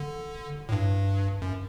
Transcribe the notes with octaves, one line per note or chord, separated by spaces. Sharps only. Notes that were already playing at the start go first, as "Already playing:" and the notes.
Already playing: D3
A2
G2
F#2